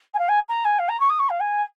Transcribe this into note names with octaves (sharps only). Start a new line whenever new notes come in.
G#5
F5
G#5
A#5
G#5
F5
A#5
C#6
D#6
C#6
F5
G#5